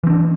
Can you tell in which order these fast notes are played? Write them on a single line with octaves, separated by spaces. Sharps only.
E3 C4 D4